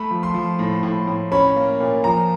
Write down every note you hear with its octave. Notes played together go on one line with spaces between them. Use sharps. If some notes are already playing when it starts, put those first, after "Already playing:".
Already playing: A3 B5
F3
C6
F3
A2
A2
A2
C#4 B5
A#3
A#2
F3 A#5